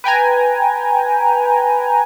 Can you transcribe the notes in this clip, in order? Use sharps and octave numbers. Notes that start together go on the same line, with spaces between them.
B4 G5 G#5 A#5